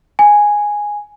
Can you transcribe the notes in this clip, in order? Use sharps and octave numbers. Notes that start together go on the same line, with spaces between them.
G#5